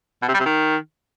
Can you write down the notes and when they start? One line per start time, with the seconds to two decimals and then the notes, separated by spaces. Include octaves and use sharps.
0.22 B2
0.28 C3
0.34 G3
0.40 C3
0.46 D#3